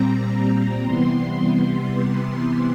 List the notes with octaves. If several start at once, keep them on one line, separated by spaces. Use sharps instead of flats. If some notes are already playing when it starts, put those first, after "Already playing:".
Already playing: A#2 G3 C4 A#5
C3 E3 G3 B3 C6